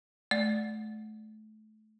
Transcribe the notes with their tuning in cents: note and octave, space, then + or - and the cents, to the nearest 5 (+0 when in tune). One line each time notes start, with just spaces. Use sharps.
A3 -30 D5 +0